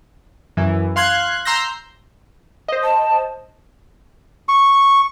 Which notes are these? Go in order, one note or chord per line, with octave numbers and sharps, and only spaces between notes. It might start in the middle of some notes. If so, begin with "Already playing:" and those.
F#2 E3
F5 C6 F#6 G#6
A#5 C6 E6 G6 A#6
C5 D#5
A5
C#6